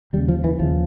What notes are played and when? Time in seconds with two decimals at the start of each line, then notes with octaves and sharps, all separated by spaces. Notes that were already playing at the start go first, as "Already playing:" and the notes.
0.13 D#2 G3
0.17 C#3
0.28 F3
0.44 E3
0.59 D#2 C#3 F3